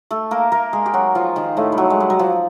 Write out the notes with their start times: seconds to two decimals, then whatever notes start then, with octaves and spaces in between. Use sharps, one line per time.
0.11 A3 A4
0.31 A#3 A#4
0.52 A#3 A#4
0.73 G#3 G#4
0.86 G4
0.94 F#3 F#4
1.15 F3 F4
1.36 D#3 D#4
1.57 A2 A3
1.72 G3
1.78 F#3
1.90 G#3
2.00 G3
2.10 F#3
2.19 F3